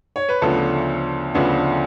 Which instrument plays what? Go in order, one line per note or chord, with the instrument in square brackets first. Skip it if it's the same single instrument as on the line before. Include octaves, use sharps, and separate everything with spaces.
[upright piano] C#5
B4
D2 C#3 F3 B3 D4 A4
D2 C#3 F3 B3 D4